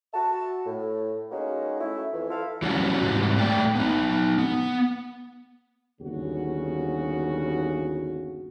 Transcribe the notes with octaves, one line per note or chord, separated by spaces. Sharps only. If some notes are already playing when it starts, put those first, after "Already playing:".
F#4 E5 A5
A2
G#3 A#3 C#4 D#4 F#4
A3 C#4 E4
F2 E3
E4 F4 A4 E5 F5
E3 G3 C#4 D4 F#4
G#2 C3 E3 G3
A2 A3 D5 G5
B3 D#4
B3
G1 D#2 C#3 F#4